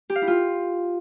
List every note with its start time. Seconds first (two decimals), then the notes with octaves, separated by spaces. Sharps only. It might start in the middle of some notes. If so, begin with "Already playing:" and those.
0.10 G4
0.16 F5
0.22 E4
0.28 F4